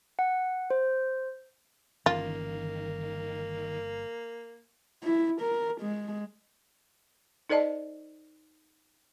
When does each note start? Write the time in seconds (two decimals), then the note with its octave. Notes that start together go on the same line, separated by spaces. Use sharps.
0.19 F#5
0.70 C5
2.06 G1 D#3 E3 A#3 C#4 F4
5.03 E4
5.41 A#4
5.82 G#3
7.49 D#4 A4 C5 D5 D#5 A5